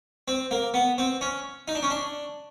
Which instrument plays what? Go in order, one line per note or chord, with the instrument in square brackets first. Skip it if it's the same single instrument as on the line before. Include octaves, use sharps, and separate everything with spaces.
[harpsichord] C4
A#3
B3
C4
C#4
D#4
D4
C#4
D4